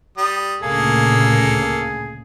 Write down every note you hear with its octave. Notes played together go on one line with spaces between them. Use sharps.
G3 D#6
D2 A#2 C#3 A#3 G#4 A4